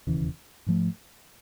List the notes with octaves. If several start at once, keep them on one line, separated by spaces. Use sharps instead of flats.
E1 D#2 C#3 E3
G#2 F3 A3